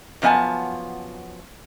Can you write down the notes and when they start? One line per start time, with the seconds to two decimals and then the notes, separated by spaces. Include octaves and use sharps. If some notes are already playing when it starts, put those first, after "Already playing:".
0.22 F#2 F3 B3 D#5 G#5 A5